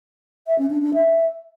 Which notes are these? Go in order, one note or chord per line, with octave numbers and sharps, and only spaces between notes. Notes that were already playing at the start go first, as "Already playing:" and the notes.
E5
C#4
D4
D4
E5